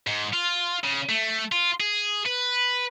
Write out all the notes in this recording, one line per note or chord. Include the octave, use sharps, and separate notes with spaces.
G#2
F4
C#3
A3
F4
G#4
B4